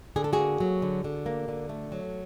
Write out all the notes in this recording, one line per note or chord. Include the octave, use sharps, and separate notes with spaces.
D3 G#4
A4
F#4 G#4
A#3
F#3
D3
D3
A#3
D3
A3
F#3